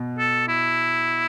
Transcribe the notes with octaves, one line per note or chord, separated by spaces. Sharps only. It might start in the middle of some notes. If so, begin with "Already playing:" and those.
Already playing: B2
A4
E4